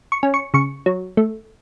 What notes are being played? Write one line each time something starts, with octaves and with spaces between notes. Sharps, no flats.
C#6
C#4
C#6
C#3 C#6
F#3
A3